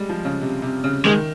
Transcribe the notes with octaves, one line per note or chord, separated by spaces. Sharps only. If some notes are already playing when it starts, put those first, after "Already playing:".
Already playing: G3 G#3
F3
C#3
C3
C3
C#3
D#3 G#3